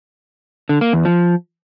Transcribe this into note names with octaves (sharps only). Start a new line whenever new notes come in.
D3
A#3
E2
F3